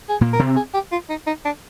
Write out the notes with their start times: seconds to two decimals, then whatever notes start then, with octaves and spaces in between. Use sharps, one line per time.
0.09 G#4
0.21 A#2 A#3
0.33 A#4
0.39 C3 C4
0.56 G#4
0.74 G4
0.92 F4
1.09 D#4
1.27 D#4
1.45 D4